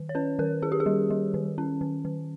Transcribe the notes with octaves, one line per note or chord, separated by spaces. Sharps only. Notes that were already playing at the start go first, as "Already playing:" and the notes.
Already playing: D#3
C#5
C#4 B4
D#3 A#4
C#4 G#4
G4
G#4
G3
G3
D#3
C#4
D#3
D#3